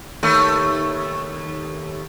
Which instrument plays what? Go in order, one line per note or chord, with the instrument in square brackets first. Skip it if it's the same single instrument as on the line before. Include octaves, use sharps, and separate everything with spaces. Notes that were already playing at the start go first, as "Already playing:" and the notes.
[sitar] D#2 A3